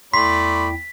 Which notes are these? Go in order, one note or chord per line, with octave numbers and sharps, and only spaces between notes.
E2 A3 E4 D5 G5 B5 C6 B6